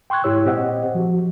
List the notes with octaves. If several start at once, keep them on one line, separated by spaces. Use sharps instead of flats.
G5 C6 C#6 F#6 G#6
G#2 E4 G4 C#5 E6
A#2 C4 G4 C5 D#5 F#5
F3 F#4